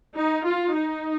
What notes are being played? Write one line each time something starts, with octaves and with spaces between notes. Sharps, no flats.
D#4
F4
D#4